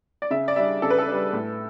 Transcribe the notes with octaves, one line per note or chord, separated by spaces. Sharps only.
D5
C#3 E5
D5
G3 D4 E5
C#3 A4
B4
A4
G3 D4
A2